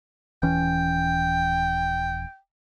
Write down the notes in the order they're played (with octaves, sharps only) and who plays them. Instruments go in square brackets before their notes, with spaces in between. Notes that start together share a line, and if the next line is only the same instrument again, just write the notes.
[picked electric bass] D#1 E3 C#4 [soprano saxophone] G5